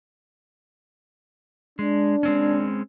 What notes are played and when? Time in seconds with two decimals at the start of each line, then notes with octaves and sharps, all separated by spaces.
1.79 G#3 D4
2.23 G#3 C4 C#4